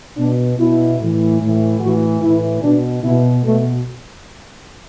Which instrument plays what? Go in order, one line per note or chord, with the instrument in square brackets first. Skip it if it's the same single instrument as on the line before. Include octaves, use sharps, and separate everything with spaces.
[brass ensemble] B2 D4
B2 E4
A2 E3
A2 E3
A2 E3 F#4
A2 E3 E4
B2 D4
B2 E4
B2 A3